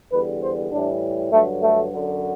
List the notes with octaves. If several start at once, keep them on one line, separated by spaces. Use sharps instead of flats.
E2 D3 G3 B4
C5
A2 E3 G3 D4
G2 D3 F#3 A3
A3
F#2 D3 F#3